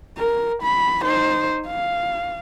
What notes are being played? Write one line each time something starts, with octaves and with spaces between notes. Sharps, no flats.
A#4
B5
D#4 C5
F5